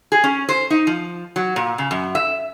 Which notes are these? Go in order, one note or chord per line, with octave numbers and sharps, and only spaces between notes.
G#4
C#4
C5
D#4
F3
F#3
A#2
C#3
F#2
E5